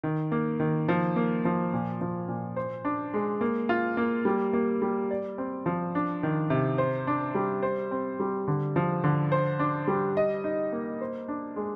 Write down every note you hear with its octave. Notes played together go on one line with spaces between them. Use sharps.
D#3
A#3
D#3
F3
A#3
F3
A#2
F3
A#2
C5
D4
G#3
A#3
F4
A#3
G3
A#3
G3
D5
C4
F3
D4
D#3
C3
C5
D4
G3
C5
C4
G3
D3
F3
D3
C5
D4
G3
D#5
D#4
A#3
C5
D4
G#3